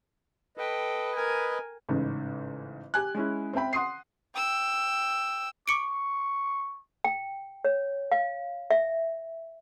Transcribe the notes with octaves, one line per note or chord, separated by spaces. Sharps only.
A4 B4 D#5 G5
A#4 G#5
A1 G#2 C#3
G4 G#5 F#6
G#3 C#4 E4
C4 C5 E5 G5 B5
F#5 C6 D#6 C7
G5 E6
C#6 D6 C#7 D7
G5
C#5
F5
E5